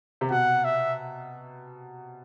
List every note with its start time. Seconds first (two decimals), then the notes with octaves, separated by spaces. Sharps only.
0.21 C3
0.31 B2 F#5
0.65 E5